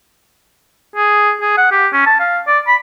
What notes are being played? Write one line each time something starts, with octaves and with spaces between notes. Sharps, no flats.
G#4
G#4
F#5
G4
C#4
A5
F5
D5
B5